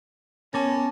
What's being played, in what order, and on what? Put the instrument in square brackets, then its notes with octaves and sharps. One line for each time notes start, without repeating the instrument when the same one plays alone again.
[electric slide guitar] B3 A#4 [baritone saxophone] C#4 [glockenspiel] A5 D6 A6